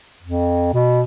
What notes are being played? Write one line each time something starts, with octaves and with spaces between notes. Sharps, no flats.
F2
B2